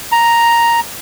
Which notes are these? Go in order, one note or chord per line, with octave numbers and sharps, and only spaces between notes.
A#5